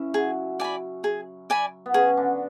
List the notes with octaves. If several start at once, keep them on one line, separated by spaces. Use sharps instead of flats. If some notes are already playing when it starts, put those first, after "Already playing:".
Already playing: C#3 C#4 E4
F#3 F#4 G#4
D5 G#5 B5
G#4
D5 G#5 B5
B3
C#3 C#4 G#4
D3 D4